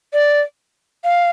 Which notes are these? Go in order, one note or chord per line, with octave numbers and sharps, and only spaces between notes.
D5
F5